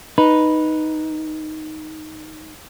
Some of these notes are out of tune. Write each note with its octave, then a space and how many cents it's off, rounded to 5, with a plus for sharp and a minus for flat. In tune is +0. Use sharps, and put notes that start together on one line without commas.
D#4 +0 B4 -5